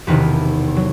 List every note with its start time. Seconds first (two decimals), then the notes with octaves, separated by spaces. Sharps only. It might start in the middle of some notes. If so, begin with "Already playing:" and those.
0.07 E1 E2 C3 D#3 B4
0.77 F#3